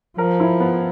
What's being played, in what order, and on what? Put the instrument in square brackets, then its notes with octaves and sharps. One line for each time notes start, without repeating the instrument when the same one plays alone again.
[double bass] F3 [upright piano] A#4
[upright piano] E4
B3